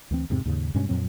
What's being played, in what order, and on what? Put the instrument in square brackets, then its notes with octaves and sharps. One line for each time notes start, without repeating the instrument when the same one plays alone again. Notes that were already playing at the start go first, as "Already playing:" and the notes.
[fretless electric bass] D2 E3 C4
E2 G#2 C3 C4
D#2 G#2 C#3
G2 B2 G#3 C#4
F2 A#2 F#3 C4